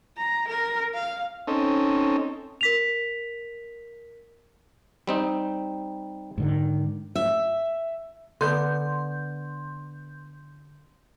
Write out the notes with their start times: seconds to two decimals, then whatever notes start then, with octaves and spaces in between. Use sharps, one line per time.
0.17 A#5
0.48 A#4
0.94 F5
1.47 C4 C#4 D#4 A4
2.61 A#4 B6 F7
5.07 G3 C4 D#4
6.38 G#2 D3 D#3
7.15 E5
8.41 D3 B3 C6 G6